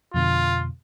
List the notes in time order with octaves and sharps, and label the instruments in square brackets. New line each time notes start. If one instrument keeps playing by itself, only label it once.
[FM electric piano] F2 B2 D3 [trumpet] F4